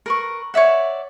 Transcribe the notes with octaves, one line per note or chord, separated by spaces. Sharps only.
A#4 B4 C#6
C#5 D5 E5 F#5